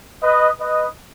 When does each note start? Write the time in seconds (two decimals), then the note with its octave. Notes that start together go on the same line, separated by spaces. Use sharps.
0.23 B4 D#5
0.60 B4 D#5